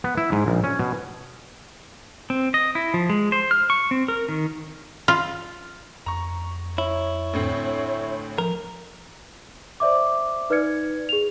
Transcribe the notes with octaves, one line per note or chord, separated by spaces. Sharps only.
B3
E4
G#2
A#1
C#4
B2
C4
D#5
E4
F3
G#3
C5
F6
C#6
C4
A#4
D#3
F4
F2 A#5 C#6
E4 C#5
D2 A2 C4
F3 A#4
C5 D5 E5 D6
D#4 B4 D5 F6 G#6 C#7
G#4 F7